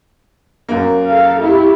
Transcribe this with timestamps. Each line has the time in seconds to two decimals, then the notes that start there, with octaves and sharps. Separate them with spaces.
0.69 F#2 A#3
1.06 A4 F5
1.40 E4 G4